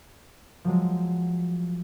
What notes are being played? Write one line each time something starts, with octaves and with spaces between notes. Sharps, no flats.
F3 F#3 G#3